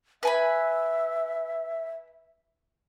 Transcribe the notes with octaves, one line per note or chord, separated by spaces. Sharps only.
B4 E5 G#5 B5